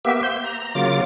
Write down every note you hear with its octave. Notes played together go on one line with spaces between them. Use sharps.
A#3 B3 G4 E5
C5 G6
A#5
C#3 F#3 A#3 F4 D6 A6